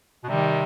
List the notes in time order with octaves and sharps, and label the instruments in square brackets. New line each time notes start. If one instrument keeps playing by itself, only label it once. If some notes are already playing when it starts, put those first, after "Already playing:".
[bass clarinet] B2
[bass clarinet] C3 [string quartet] D#3 G3